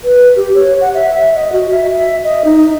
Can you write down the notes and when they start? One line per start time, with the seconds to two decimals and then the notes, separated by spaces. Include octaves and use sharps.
0.04 B4
0.36 G4
0.55 C#5
0.81 F#5
0.94 E5
1.09 E5
1.35 D#5
1.53 F#4
1.71 E5
1.93 E5
2.24 D#5
2.45 D#4